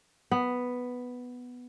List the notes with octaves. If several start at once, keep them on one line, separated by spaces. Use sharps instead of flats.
B3